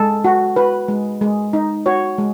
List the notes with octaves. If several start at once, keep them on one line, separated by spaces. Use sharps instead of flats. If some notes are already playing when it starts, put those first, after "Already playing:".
Already playing: G#3 A4
F#4
F#4 B4
G#3
G#3
D#4
F#4 C#5
G#3